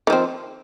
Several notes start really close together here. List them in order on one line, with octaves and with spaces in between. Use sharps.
D#3 F3 C4